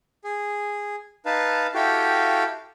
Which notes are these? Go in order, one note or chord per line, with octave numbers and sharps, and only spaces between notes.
G#4
D#4 B4 F5 A5
E4 F#4 G4 A4 F5 G5